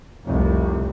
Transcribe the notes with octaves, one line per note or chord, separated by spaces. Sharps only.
F1 C2